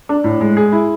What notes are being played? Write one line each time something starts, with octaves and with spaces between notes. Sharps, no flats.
D4
A2
G#3
G#4
E4